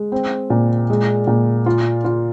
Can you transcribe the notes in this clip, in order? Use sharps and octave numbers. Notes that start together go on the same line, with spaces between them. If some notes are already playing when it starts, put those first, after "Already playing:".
Already playing: G#3
C4
A#2
G#3
A#2
F4
F4